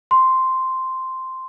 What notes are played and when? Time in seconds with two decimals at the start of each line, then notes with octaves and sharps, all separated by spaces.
0.11 C6